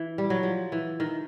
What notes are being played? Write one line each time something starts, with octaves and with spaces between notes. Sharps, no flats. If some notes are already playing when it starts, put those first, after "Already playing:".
Already playing: E3
G3
F#3
F3
E3
D#3